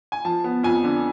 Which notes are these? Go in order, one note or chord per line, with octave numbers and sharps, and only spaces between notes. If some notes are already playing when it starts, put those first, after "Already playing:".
G#5
F3 A5
B3
F2 G#5
D3